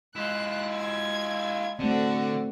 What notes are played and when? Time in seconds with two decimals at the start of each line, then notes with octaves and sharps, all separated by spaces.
0.16 G#3 E4 F4 F#6
0.73 G#6
1.79 D3 A3 C4 F#4 D5